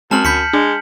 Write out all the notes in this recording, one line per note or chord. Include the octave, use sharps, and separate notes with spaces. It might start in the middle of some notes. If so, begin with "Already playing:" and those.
F#2 G#3 C4 A5 F6 F#7
D2 B5 G6 B6 C#7
G#3 D4